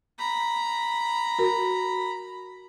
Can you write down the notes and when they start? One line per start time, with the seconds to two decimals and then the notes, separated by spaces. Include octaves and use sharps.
0.19 A#5 B5
1.39 F#4 A#4